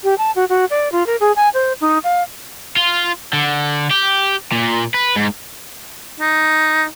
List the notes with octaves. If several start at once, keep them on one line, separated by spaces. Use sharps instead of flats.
G4
A5
F#4
F#4
D5
F4
A#4
G#4
G#5
C5
D#4
F5
F4
D3
G4
A#2
B4
G#2
D#4